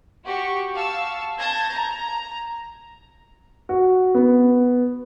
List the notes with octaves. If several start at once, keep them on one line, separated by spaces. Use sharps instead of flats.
F#4 G4 C#6
F5 A5 C#6 E6
A5 G6 G#6 A#6
A#5
F#4
B3